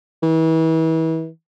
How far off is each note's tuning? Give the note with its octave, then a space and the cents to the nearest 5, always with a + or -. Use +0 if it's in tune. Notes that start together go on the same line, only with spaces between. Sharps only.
E3 -35